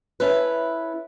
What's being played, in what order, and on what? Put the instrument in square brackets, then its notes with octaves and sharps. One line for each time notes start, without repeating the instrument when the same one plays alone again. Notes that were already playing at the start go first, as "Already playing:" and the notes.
[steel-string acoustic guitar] C#4 E4 A4 B4